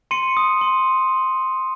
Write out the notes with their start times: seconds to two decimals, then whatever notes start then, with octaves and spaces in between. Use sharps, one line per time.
0.11 C6 C#7 D#7
0.37 D#6
0.61 C6